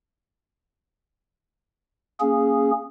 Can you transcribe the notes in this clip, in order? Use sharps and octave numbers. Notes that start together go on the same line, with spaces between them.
A#3 C#4 G#4